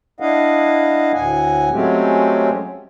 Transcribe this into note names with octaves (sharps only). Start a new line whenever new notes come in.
D4 E4 D#5 F5 F#5
D2 A2 F#5 G#5
F#3 G#3 A3 C4 C#4 G4